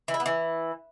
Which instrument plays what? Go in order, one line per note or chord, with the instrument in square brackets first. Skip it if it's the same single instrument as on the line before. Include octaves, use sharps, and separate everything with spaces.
[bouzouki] E3
E4
B3
E3